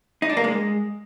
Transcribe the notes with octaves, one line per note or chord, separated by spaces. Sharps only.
D#4
D4
A#3
G#3